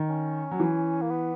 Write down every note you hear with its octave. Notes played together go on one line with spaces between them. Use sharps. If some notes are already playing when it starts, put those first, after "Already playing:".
Already playing: D#3
C#4
F#3
E3
A#3
B3